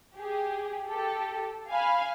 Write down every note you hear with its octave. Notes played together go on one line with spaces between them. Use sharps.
G4 G#4
G4 A4
F5 G#5 B5 F6